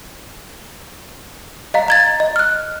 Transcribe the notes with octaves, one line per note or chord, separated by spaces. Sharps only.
D#5 F5 A#5
A#5 G#6 A6
D#5
F6 F#6